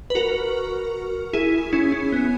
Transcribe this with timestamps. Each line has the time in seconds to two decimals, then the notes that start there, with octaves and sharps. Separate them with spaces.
0.10 B4
0.15 F#4 A#4
1.33 E4 G#4
1.73 C#4 E4
1.92 C#4
2.12 B3